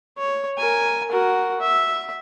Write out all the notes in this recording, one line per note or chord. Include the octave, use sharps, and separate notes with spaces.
C#5
A#4 G#5
F#4 A#4
E5